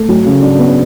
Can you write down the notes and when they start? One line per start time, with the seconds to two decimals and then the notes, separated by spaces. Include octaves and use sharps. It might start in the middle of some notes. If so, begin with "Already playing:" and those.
Already playing: A3
0.09 F#3
0.26 C#3
0.42 D4
0.59 B3